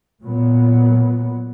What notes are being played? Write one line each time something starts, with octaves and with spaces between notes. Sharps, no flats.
A#2 F#3 B3